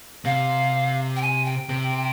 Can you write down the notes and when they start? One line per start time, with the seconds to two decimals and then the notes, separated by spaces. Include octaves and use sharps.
0.25 C3 F5
1.16 G5
1.22 G#5
1.45 G5
1.69 C3